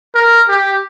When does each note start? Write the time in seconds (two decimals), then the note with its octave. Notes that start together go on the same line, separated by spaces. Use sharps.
0.15 A#4
0.49 G4